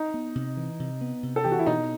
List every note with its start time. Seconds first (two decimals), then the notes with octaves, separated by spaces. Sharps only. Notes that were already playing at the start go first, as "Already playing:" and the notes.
Already playing: D#4
0.14 B3
0.35 C3
0.57 E3
0.80 C3
1.01 B3
1.23 C3
1.36 A4
1.44 E3 G4
1.51 F#4
1.59 E4
1.66 B2 D#4